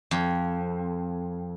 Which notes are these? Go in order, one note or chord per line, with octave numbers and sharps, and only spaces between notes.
F2